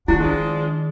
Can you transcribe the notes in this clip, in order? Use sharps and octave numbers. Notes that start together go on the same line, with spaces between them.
D#3 D4 E4 F#4
F3 G#3 D4